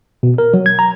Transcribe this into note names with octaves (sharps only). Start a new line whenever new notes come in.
B2
A#4
F#3
G#6
A#5